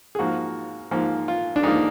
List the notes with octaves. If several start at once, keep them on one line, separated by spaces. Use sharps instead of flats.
G#4
G#2 F3 A#3 F#4
G#2 F3 A#3
F4
D4
G#2 F3 A#3 D#4